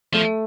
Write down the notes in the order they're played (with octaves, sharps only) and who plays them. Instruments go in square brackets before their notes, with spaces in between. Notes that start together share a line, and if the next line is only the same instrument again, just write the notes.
[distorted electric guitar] F3 [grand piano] A3